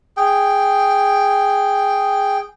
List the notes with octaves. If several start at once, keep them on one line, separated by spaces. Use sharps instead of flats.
G#4 G5